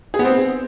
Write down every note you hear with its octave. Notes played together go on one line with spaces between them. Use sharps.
G#4
B3
C4